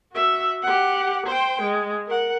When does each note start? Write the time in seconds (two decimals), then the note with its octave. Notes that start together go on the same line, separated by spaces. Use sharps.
0.13 F#4 E5
0.62 G4 F#5
1.27 C5 G5
1.62 G#3
2.06 A#4 F#5